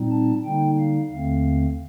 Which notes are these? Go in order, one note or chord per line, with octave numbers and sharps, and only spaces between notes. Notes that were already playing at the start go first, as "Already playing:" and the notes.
Already playing: A#2 G3 C4 D#4
A5
D3 G3 A#3 D#4 G5
F5
D#2 D3 A3 C4 F5